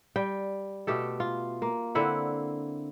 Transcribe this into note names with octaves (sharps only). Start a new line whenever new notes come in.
G3 G5
B2 A3 G4 A4
F4
A#3
D3 C4 E4 F#5